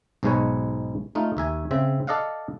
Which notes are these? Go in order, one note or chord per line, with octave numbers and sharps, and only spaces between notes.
B1 G#2 B2 G#3 B4 C#5
A3 D#4 F4
D#2 E5 G#5
C#3 C4 E5
A4 D5 D#5 F5 F#5